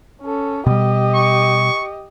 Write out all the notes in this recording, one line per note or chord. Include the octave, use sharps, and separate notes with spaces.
C#4 A4
B2 G3 G4 D#5
C#6